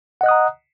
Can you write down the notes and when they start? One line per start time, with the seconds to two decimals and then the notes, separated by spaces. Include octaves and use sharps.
0.21 F#5
0.23 D#5
0.26 F#6
0.29 D#6
0.31 A#5